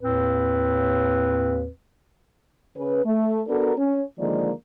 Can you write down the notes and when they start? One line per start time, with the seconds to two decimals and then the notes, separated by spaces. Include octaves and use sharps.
0.01 D#2 A2 C4 B4
2.76 C#3 B4
3.04 A3
3.47 B3 D4 F#4 A4 A#4
3.77 C#4
4.18 D3 D#3 F3 G#3 A#3 D5